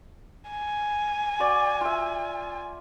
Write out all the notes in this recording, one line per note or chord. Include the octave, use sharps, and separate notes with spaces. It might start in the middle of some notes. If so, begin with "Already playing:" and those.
G#5
F#4 D5
F4 E5